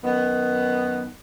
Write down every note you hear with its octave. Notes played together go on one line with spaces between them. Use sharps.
F#2 D#3 B3